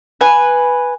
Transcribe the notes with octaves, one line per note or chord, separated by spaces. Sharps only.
B4 G#5